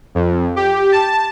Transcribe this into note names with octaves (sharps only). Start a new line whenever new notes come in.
F2
G4
A5